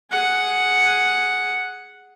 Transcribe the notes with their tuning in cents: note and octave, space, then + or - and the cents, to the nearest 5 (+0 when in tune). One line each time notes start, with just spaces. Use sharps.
G#4 +0 F#5 +0